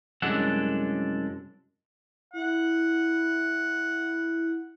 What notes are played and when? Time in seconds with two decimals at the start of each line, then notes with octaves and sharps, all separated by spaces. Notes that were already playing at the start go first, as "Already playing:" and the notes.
0.22 C2 F#2 G#3 D4 A4 F#5
2.33 E4 F#5